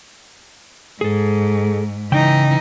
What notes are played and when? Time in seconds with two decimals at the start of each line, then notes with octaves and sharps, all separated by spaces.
1.01 G#2 G#4 A4
2.12 C#3 E3 D#4 G5